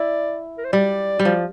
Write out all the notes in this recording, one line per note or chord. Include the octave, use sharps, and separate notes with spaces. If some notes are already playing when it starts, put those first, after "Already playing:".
Already playing: E4 D5
A#4
C5
G3 D5
G3
F3